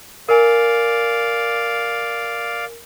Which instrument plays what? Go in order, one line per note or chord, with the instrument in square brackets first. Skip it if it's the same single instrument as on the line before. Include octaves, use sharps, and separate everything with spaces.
[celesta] A#4 G#5 [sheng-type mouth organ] D5 F5